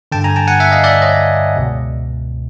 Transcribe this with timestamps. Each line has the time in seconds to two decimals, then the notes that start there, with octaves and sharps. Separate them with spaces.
0.12 G2 D3 G5 A5
0.24 G#5 A#5
0.36 G5 A5
0.48 F#5 G#5
0.60 E5 F#5
0.72 D#5 F5
0.84 D5 E5
1.02 C#5 D#5
1.56 C#2 B2